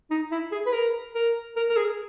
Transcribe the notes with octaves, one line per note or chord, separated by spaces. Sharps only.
D#4
E4
G#4
B4
A#4
A#4
A#4
A#4
G#4